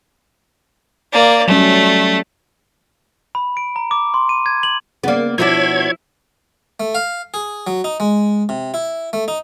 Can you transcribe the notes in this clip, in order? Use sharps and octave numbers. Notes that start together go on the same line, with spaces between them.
A#3 D5
F#3 G3 A3 C#4
B5
D7
A#5
D6
C6
D#7
G#6
F#7
C#3 A#3 B3 D5
B2 F3 B3 D4 E4 C#5 G#6
A3
F5
G#4
F#3
D#4
G#3
C3
E4
A3
D#4